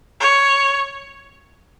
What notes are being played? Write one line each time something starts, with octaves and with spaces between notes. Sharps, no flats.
C#5